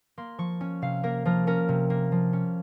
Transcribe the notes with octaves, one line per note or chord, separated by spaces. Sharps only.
A#3 C6
F3 C#6
C#4
C3 F5
A#3 A#4
F3 A#4
C#4 A#4
C3
A#3
F3
C#4